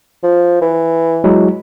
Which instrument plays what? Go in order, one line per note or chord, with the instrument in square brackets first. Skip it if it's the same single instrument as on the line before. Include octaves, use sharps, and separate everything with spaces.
[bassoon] F3
E3
[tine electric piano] F#3 G#3 E4